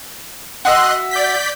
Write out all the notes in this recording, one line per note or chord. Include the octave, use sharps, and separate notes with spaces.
F#4 D#5 E5 C6 F#6
D5 G6 B6